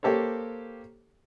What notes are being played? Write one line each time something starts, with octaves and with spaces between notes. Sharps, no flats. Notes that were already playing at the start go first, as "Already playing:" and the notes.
A#3 G4 A4 C5 C#5